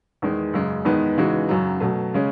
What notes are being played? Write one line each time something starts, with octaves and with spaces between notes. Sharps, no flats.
E2 D#3 G#3
F#2 C#3 G#3
E2 D#3 G#3 B3 D#4
C#3 E3 G#3 D#4 F#4
F#2 C#3 F#3
B2 F#3 A3
C#3 G#3 C#4